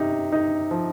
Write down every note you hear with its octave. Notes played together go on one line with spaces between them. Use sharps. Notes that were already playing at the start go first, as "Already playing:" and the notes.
Already playing: C3 D#4
D#4
F3